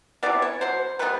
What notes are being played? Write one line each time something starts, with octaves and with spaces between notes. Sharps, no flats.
C3 E3 G#3 B3 D5
C#5
B2 F#3 C5
D#3 G3 B3 B4